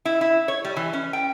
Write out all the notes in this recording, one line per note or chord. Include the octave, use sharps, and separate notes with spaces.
E4
E4
C#5
G3
E3
C#4
G5